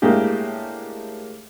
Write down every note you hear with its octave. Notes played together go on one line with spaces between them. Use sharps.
A2 G#3 A#3 D4 G4